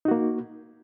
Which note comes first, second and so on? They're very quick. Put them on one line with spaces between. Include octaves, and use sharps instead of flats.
D#4 F#4 A#3